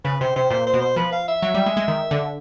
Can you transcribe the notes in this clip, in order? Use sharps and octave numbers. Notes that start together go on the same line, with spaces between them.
C#3 B4
C3 C5
C3 C5
A#2 C5
C5
B2
C5
F3 B4
F5
E5
F#3
G3
G#3
G#3
D#3
D3